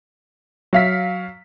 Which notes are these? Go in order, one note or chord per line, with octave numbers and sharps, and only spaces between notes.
F#3 F5 B6